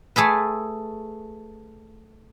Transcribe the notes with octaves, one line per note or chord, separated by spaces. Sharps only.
A3 G#4 A4 B4